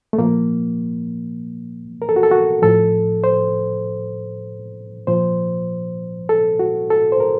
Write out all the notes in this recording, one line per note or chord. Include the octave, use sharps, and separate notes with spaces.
A3
A#2 F3 A#3
A#4
A4
F#4
A4
F#4
A2 F3 A4
C5
A#2 F3 C5
A4
F#4
A4
C5
A#4